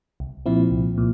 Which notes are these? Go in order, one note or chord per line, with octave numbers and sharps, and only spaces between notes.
C2
A#2 F3 C4 E4
C2
A#2